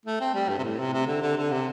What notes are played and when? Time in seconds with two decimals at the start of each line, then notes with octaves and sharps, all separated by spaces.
0.05 A3
0.20 C4
0.34 G3
0.49 G2
0.58 C3
0.63 A2
0.79 C3
0.93 C3
1.07 D3
1.22 D3
1.37 D3
1.52 C3